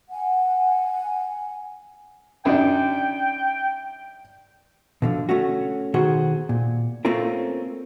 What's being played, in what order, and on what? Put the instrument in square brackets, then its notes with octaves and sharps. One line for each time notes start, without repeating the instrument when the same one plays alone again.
[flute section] F#5 G#5
[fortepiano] F#2 D4 D#4 [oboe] G5
[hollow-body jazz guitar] B2 D3 F3
A3 C#4 F#4
B2 D#3 F#4 G#4 C5
A#2
A3 A#3 C4 C#4 F4 A#4